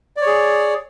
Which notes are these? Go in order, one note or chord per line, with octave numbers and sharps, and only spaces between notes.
G#4 C#5 D5